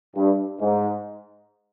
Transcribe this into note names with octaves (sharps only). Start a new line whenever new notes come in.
G2
G#2